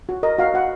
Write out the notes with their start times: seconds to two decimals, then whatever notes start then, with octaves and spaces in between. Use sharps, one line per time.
0.09 F#4
0.23 A#4 D#5
0.38 F#4 F5
0.54 F#4 F#5